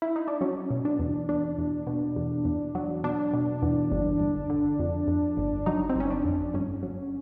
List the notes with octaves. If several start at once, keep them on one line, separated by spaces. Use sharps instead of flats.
E4
D#4
D4
F#3 C#4
B2
D4
E2
B2 D4
E2
B2
E2
E2
F#3
B2 D4
B2
E2
G1
G1
D3
F2
F2
G1
F#3 D#4
C4
G1 C#4
D4
F2
G1 C#4
F#3